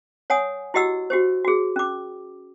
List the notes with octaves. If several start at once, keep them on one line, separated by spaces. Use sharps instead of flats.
C#5 F#5 G#5 D#6
E4 F#4 G4 D#5 F#5 E6
F#4 G4 C5
F#4 G#4
C#4 D6